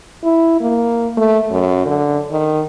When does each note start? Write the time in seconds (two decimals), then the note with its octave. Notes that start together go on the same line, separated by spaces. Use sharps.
0.24 E4
0.61 A#3
1.17 A3
1.51 F#2
1.86 D3
2.32 D#3